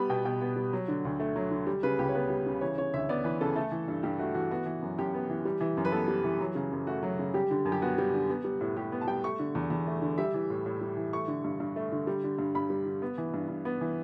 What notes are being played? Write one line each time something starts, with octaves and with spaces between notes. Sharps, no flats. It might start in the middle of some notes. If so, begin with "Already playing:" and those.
Already playing: G3 B3 B5
B2 G5
B2 G5
B3
G3
F#3
D3
D2
A3
F#3
D3
G3
C#3 B4
C#2 G4
C#5
B3 B4
G3
C#3
E3 C#5
C#3 C#5
D2 E5
B3 D5
E3 B4
C#3 A4
A3 A4
E3
G2
G2 G4
A3 F#4
E3 F#4
B3 F#4
E3
F#2
F#2 G4
B3
E3
G3
E3
F#2
B4
B3 A4
G3
E3
F#3
C#3
F#2
A3 F#4
F#3
C#3
G3 G4
D3
F#2
G4
B3 F#4
G3
D3
B3
G3
A2
A2 G4
B3
A5
G3 G5
A3 C#6
D3
E2
E2
A3
D3
G3 E5
E3
A2
A2
G3
E3
A3 C#6
D3
G2
G2
A3
D3
G3
D3
G2
G2 B5
G3
D3
B3
E3
G2
G2
B3
E3